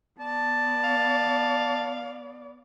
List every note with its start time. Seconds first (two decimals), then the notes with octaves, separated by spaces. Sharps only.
0.19 B3 D5 A5
0.84 F5